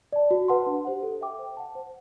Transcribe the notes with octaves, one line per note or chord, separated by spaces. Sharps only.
D5 A5
F#4
B4 F#5 A5 C6
D4
G4 C5 F#5
A4
E5 G5 D6
C5
F#5 A5
C5